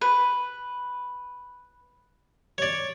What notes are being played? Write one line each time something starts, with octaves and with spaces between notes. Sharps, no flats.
B4
C#5 D5